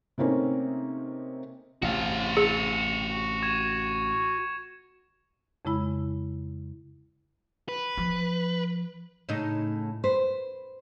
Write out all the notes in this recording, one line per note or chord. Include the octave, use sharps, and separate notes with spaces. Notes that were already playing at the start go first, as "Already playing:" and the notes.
C3 A3 A#3 C4 C#4 D#4
A1 C3 F#4 F5
G#4 C#7 F7
C#6 G#6 E7
F2 C#3 G#3 E4 B5
B4
F3
A2 C#3 D#4
B4 C5